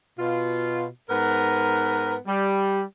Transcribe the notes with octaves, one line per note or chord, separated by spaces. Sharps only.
B2 F4
G#2 B3 A#4 B4 A#5
G3